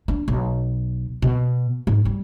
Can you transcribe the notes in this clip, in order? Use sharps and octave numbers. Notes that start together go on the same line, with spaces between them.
D4
B1
B2
G#2
G3